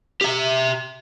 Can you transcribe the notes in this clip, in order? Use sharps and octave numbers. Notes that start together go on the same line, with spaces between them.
G4 E5